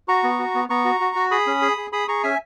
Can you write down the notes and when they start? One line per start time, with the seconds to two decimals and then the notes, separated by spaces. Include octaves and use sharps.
0.08 F#4 A#5 C#6
0.23 B3
0.39 F#4
0.54 B3
0.69 B3 A#5 C#6
0.85 F#4
1.00 F#4
1.16 F#4
1.31 G#4 B5 D#6
1.47 C#4
1.62 G#4
1.77 G#4
1.92 G#4 B5 D#6
2.08 G#4 A#5 C#6
2.23 C#4 E5 G#5